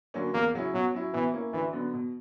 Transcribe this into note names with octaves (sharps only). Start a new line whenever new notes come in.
D3 F#3 A#3 C#4
E2 A#3
C#3 F#3 C#4 E4
B2 F#3
F#3 C#4 E4
B2 E3
A#3 C#4 E4
D2 E3
D3 F#3 B3
B2